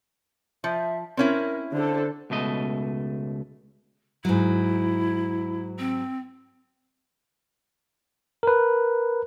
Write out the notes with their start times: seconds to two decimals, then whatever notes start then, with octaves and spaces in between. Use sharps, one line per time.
0.64 F3 E5
1.17 C4 C#4 E4 A#4
1.74 D3 A4 C5
2.30 C#2 B2 A3 D#5
4.25 G#2 F#3 E4
5.79 C4
8.43 A#4 B4